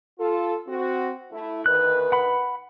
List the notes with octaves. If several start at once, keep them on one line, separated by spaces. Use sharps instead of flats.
F4 A4
C4 F#4
A3 E4
D2 D#3 B4 F#6
F#5 B5